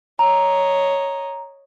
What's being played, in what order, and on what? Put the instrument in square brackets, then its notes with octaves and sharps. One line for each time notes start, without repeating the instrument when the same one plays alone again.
[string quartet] C#5 D#5 [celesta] A#5